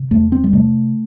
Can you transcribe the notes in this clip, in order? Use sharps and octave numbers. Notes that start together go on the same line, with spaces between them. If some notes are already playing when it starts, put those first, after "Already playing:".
Already playing: C3
E2 A3
C4
G3
C3 A3